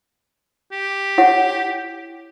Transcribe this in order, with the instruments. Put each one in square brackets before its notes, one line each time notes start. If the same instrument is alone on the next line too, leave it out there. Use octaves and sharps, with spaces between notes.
[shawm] G4
[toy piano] E4 C#5 F#5